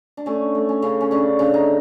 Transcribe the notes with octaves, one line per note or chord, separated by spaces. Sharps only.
D4
A3 C#4
A3
C#4
C#3
C#4
C#3 D4
C#3
D#4